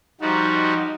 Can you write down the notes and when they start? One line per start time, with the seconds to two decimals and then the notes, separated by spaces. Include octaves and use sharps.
0.21 F3 G3 D#4 F#4